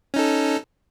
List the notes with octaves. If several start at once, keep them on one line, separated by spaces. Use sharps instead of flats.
C#4 D#4 A4